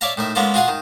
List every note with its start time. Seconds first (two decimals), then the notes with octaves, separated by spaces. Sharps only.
0.01 C#5 D5 E5 F5 A5 A#5
0.17 A2 D#3 E5
0.35 G#3 A#3 B3 C#4 F4 A4
0.54 F4 F#4 G#4 F5 F#5
0.68 D#3